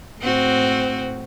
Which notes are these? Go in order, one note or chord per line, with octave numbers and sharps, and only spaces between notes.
A2 C4 F#4